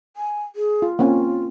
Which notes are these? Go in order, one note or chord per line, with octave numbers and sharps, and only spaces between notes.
G#5
G#4
F4
A#3 C4 C#4 F4